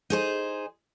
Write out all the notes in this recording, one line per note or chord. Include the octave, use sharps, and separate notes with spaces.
D#4 G#4 C5